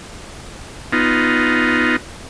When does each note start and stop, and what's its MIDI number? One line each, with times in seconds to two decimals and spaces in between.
0.92 1.96 59
0.92 1.96 63
0.92 1.96 65